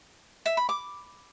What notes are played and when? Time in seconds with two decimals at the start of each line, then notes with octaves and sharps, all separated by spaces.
0.46 E5
0.57 B5
0.69 D6